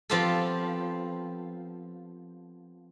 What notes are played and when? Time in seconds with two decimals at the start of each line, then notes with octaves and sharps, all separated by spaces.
0.10 F3 B3 C4 F4 G4 A4